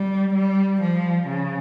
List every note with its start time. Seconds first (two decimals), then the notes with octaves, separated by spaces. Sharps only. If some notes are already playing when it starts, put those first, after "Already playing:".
Already playing: G3
0.33 G3
0.81 F3
1.27 C#3